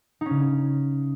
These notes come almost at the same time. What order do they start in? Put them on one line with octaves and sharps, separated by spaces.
D#4 C#4 C#3